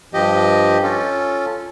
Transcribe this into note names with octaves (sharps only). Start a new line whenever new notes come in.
G2 F3 G4 D#5
C#4 F4 A4